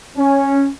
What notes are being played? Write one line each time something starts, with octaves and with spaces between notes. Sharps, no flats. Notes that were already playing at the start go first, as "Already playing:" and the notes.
C#4